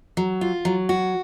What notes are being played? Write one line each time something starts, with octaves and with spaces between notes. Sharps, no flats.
F#3
F4
F#3
F#4